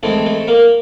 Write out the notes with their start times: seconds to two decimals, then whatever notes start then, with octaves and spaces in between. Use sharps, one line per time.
0.03 E3 G#3 A3 C4 A4
0.25 A3 A4
0.47 A#3 A#4